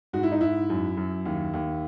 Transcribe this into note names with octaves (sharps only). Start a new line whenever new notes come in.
G#2 F#4
E4
D#4
G#2 E4
F#2
F#2
D#2
D#2